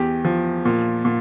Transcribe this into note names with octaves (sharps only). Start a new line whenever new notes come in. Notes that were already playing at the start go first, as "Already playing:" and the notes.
Already playing: E2 E3 G4
F3
A#2
A#2